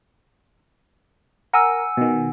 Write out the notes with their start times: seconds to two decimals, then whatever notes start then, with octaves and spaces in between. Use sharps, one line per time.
1.53 A#4 F#5 G#5 E6
1.97 B2 D#3